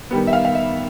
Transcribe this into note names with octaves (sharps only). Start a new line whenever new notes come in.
D#3 G3 B3
E5
F5
F5
E5